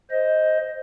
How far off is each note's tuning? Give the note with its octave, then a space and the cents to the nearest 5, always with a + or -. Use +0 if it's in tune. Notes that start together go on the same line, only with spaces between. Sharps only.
C5 +0 D#5 +5